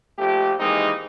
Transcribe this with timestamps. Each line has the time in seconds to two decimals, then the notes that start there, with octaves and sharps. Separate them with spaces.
0.19 A#1 F3 A3 G4
0.60 D#3 E3 G#3 A#3 C4 D#4